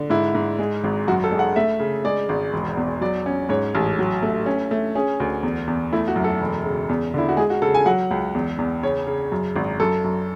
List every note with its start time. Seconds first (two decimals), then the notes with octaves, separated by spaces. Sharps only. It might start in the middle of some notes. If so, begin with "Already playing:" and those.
Already playing: D3
0.10 G#2 E4
0.35 G#2
0.59 G#3
0.84 G#1
1.08 F#2 F#4
1.24 A4
1.31 G#3
1.39 F#5
1.56 A3 E5
1.80 C#3
2.04 G#3 D5
2.29 G#1
2.53 E1
2.77 E2
3.01 F#3 D5
3.26 C#4
3.49 G#2 C#5
3.75 A1
3.99 F#3
4.23 A3
4.46 C#4
4.71 A3
4.95 C#4 G#4
5.20 D2
5.43 E2
5.67 E2
5.93 A3 E4
6.08 F#4
6.16 F#2
6.24 A4
6.41 E1
6.65 C#3
6.89 E2
7.14 D3 E4
7.29 F#4
7.37 G#3 G#4
7.50 F#4
7.62 C#3 A4
7.74 G#5
7.86 F#3 F#5
8.11 C#2
8.35 E2
8.58 E2
8.83 C#3 C#5
9.07 C#3
9.32 F#2
9.56 G#1
9.80 F#2 A4
10.04 F#2